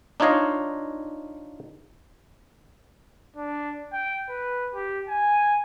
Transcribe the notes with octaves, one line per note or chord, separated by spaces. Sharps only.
D4 D#4 F4 C#5 D#5 F5
D4
G5
B4
G4
G#5